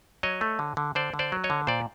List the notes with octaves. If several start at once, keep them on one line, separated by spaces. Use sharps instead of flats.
F#3 C#5 D#5
A3
D3
D3
D3 C5 D5
D3
C5 D5
F#3
C#5 D#5
D3
A#2 C5 D5